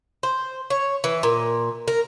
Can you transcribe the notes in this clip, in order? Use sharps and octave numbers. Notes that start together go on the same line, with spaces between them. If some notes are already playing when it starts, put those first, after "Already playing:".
C5
C#5
E3
A#2
A#4